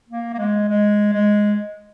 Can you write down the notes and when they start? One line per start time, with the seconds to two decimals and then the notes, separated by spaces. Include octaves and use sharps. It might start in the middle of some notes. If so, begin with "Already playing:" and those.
0.09 A#3
0.34 A#3
0.39 G#3
0.69 G#3
1.13 G#3